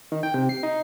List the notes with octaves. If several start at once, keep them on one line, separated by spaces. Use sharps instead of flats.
D#3
G5
C3
C7
D#4